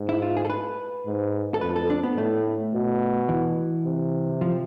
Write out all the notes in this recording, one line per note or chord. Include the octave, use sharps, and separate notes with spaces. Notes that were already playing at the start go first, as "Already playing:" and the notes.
Already playing: G#2
E4
F4
G#4
A4
B4
G#2
A4
F2 B4
A4
D4
B3
A2 A3
B2
E3
C3
F3